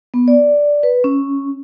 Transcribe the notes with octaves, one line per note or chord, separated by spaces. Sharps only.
B3
D5
B4
C#4